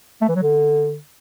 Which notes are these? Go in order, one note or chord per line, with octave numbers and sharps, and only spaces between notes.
A3
E3
F#3
D3